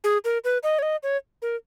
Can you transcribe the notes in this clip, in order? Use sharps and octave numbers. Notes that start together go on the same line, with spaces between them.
G#4
A#4
B4
D#5
C#5
D#5
C#5
A#4